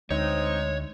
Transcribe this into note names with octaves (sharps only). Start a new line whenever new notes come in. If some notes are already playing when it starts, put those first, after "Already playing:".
D2 G#3 C4 D#4 C#5